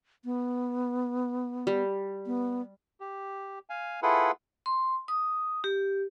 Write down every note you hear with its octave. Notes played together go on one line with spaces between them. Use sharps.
B3
G3
B3
G4
F5 G#5
E4 F4 G#4 A4 B4 F#5
C6
D#6
G4